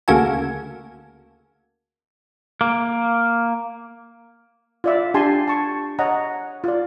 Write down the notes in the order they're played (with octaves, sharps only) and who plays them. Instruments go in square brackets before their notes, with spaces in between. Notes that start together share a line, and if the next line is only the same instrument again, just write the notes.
[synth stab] D2 C#3 A#3 F#4 A4 G#5
[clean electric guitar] A#3
[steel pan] F4 D5 E5
D4 G4 G#5 A5 C6
A5 C#6
C#5 D#5 F#5 A#5
F4 D5